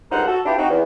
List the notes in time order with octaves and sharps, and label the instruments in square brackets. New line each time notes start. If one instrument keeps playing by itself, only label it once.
[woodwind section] C#2 G2 D#4 A#4 C5 F#5
F#4 A4
B3 D4 E4 F4 G4
C4 D#4 F#4
E2